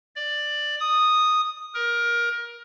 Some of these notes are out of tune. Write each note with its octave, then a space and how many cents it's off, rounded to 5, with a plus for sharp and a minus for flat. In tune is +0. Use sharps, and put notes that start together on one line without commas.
D5 +10
D#6 -5
A#4 +20